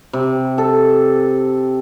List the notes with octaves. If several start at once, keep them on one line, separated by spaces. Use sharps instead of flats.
C3
A4